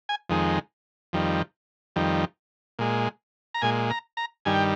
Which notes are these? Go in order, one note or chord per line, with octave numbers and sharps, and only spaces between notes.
G#5
F2 D#3 G#3
F2 D#3 G3
F2 D#3 G3
A#2 G#3
A#5
A#2 G#3 G#5
A#5
A#5
G2 D#3 G3 G#5
G5